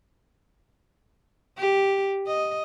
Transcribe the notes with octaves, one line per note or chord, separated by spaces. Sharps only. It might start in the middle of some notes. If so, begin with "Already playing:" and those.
G4
D#5